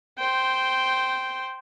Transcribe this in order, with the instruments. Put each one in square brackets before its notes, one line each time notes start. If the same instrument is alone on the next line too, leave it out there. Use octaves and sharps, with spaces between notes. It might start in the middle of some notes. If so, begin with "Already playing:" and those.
[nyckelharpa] C5 G5